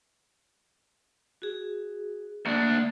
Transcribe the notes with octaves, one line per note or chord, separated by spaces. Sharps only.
F#4 G#4
D2 A#3 D4